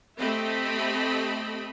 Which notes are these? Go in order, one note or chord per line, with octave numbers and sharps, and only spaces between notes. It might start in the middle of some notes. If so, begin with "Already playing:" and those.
A3 C4 G4 D#5 E5 B5